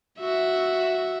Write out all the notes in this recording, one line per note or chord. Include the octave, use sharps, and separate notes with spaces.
F#4 E5